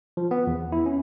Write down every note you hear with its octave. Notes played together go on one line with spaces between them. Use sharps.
F3
B3
E2
E4
C#4